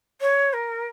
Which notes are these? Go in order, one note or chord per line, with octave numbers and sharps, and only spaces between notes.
C#5
A#4